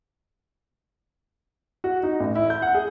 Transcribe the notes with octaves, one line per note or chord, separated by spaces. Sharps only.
F#4
D#4
A1
E4
G6
F#5
G#4